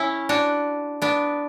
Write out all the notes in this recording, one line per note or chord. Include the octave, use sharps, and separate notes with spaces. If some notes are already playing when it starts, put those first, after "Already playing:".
Already playing: C#4 E4
D4 F#4
B3 D4